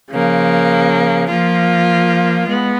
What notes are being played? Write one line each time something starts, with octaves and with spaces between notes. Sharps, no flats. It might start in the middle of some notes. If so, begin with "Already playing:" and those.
C#3 F3 A#3
F3 A#3 F4
G#3 B3